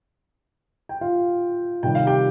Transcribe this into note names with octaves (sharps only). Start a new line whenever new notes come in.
G5
F4 F5
C3 D#3 G3 G5
F5
G4 G5